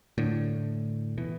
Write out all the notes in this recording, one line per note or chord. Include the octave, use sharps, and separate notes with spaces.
A2 D3
B2 E3